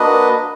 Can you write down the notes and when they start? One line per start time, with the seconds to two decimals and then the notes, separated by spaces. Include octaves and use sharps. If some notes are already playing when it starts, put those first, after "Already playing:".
Already playing: A#3 D4 F#4 B4 D#5